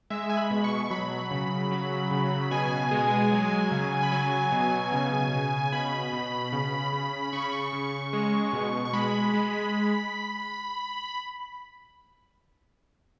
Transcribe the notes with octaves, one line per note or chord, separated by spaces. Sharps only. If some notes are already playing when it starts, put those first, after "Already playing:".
G#3 E5
G#5
B5
B2
C#6
F#3 B5
C#3
F#3
C#3
B2 G#5
G#3
F#3
C#3
B5
F#3 G#5
B2
C#3
C#3
B2 B5
B2
C#3
C#3
C#3 C#6
B5
C#6
C#3
G#3
B2
C#6
G#3 B5
G#3